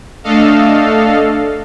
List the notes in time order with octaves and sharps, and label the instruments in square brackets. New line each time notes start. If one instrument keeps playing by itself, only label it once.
[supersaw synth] A3 D4 A4 D#5 F5